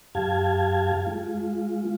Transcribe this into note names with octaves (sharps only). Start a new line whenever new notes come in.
F#2 G4 F5 A5 G#6
G#3 F4